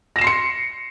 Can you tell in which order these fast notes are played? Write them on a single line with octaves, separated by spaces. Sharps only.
A#6 E7 C7 C6 C#7